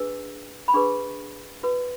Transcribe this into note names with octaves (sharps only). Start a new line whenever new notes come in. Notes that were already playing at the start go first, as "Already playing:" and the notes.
Already playing: D4 G#4 B4 E6
B5
D4 G#4 B4 C#6
F#4 B4